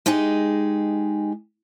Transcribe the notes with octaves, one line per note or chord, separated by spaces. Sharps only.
G#3 D#4 G4 G#4